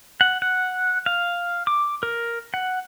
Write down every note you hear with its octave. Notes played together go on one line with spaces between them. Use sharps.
F#5
F#5
F5
D6
A#4
F#5